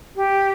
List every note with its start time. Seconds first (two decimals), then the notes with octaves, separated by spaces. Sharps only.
0.16 G4